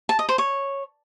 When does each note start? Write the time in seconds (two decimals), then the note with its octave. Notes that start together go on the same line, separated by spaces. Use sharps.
0.09 A5
0.19 D#5
0.29 C5
0.38 C#5